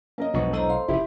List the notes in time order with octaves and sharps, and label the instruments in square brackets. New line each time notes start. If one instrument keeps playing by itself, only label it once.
[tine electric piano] A#3 [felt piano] C#4 A#4 D#5
[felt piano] E1 C#6 [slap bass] B1 [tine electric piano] F3 B3 D#5
[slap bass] B1 [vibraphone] E4 D#5 A#5 [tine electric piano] A4 C5
[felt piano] F5 [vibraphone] C6
[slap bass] F1 G#2 C#3 [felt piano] E4 G4